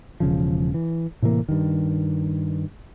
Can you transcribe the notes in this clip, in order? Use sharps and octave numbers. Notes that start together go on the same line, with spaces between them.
E1 C#3 F3
E3
A2 C3 E3 A#3
G2 D#3